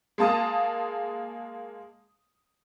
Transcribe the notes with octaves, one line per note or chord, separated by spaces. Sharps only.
G#3 A#3 A5 D#6